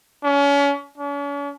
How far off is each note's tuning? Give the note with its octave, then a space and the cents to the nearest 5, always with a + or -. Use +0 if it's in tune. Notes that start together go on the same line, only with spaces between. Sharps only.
C#4 +35
C#4 +45